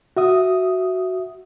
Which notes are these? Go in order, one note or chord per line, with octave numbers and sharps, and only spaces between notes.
F#4 E5 D#6